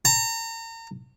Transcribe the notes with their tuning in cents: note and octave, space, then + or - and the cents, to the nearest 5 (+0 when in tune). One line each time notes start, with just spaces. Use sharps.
A#5 -35